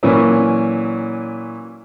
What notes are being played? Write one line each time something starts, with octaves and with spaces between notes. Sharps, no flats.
A#2 E3 F#3 C#4